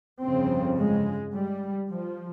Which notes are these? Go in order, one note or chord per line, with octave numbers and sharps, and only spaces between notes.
G1 F2 C#3 C4
G#3
G3
F3